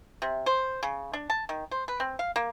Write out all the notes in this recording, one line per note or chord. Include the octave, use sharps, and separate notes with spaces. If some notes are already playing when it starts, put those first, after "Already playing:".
C3
C5
C#3
D4
A5
D#3
C5
B4
C4
F5
A#3